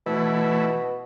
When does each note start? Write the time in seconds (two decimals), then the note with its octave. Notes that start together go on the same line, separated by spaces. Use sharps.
0.06 B2 E3 A3 E4